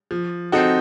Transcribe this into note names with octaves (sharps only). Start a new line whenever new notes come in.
F3
C4 D#4 F#4 A4